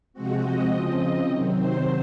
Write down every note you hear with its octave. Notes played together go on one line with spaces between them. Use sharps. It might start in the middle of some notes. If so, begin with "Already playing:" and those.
C3 F3 G#3 C4 F#4
D#5
C#3 F3 C4 D#5
C3 D#3 F#3 C4
C5